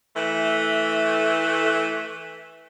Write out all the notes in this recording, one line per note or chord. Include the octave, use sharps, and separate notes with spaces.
E3 A3